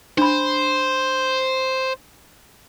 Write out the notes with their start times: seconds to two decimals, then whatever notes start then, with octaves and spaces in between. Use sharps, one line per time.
0.18 D4 C5 B5